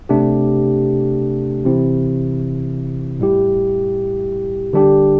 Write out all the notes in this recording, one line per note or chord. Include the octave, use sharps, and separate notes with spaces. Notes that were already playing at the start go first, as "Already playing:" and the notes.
C3 A3 D4 G4
C3 E3 C4 E4
A2 G3 E4 G4
D3 G3 D4 G4